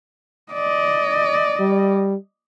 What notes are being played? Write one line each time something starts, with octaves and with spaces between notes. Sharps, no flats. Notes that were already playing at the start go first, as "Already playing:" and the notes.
D5 D#5
G3